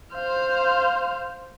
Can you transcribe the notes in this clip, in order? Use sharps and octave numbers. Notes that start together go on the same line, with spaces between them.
C5 F5